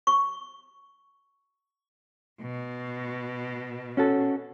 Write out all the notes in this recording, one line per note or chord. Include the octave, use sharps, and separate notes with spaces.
C#6
B2
C#4 F#4 A4